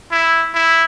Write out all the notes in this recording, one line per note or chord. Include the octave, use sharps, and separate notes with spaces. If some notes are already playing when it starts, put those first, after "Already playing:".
E4
E4